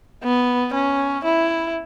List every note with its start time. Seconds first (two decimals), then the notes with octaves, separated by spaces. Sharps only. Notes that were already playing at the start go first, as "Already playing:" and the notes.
0.23 B3
0.74 C#4
1.24 E4